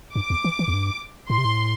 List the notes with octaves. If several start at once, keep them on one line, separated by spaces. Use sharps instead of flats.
G2 D6
E2
E3
E3
E2
G2
A2 C6
C3
A2